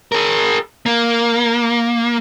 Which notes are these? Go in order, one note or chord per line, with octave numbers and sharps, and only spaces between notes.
G#4 A#4
A#3